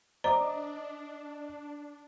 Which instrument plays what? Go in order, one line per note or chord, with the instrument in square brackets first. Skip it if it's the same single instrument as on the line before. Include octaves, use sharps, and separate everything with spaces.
[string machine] D4 [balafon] C5 A#5 [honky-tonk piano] D5 D#5 D6